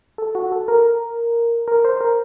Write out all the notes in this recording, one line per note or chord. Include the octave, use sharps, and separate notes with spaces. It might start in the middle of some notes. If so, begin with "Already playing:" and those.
A4
F#4
A4
A#4
A#4
C5
A#4